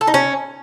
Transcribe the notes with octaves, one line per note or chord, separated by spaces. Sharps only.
A4
D#4
C#4